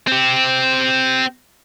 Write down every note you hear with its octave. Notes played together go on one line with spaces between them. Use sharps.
C4 G4